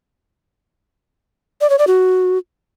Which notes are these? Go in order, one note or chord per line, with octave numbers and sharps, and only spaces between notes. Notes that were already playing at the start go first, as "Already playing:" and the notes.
D5
C#5
D5
F#4